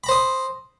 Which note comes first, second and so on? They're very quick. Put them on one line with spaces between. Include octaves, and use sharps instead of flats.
B5 A#5 C5 D#6